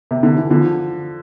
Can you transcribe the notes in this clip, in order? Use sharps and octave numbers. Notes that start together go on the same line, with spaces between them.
C3
D3
E3
D3 F3